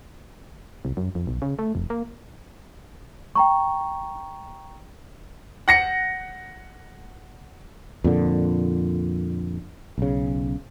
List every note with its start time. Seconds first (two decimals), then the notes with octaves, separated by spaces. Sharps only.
0.85 C2
0.97 F#2
1.15 F2
1.27 B1
1.42 C#3
1.59 A3
1.75 F1
1.90 A#3
3.35 G5 A#5 C#6
5.68 F#5 A#6 C#7
8.04 F2 A#2 D3
9.98 B1 C#3